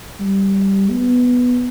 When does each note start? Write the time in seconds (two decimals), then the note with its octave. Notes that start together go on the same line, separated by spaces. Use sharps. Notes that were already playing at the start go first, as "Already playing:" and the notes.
0.20 G3
0.91 B3